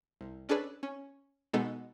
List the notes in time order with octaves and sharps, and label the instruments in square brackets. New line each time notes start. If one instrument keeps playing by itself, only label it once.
[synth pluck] C2
C#4 D4 G#4 A4 B4 D5
C#4
B2 G#3 B3 D#4 A4